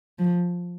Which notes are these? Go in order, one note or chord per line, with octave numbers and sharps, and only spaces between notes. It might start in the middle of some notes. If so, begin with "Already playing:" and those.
F3